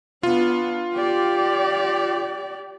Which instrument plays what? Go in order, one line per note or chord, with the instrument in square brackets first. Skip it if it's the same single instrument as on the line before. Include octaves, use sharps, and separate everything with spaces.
[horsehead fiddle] B3 D4 [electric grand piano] F4
[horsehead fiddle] G4 D5